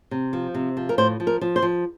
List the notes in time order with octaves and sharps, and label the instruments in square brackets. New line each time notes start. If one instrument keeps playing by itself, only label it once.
[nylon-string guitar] C3
F3
C3
F3
A#4
A2 C5
F3
A#4
F3
C5
F3